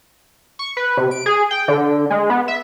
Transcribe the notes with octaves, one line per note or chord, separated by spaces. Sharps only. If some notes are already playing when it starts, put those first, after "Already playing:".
C#6
B4
C3
D7
G#4
G5
D3
G#3
B3
E5